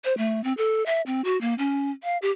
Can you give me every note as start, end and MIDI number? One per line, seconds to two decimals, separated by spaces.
0.05 0.16 72
0.18 0.43 57
0.44 0.53 60
0.57 0.83 69
0.86 1.01 76
1.06 1.21 60
1.24 1.40 66
1.41 1.54 58
1.58 1.91 61
2.03 2.18 77
2.22 2.31 67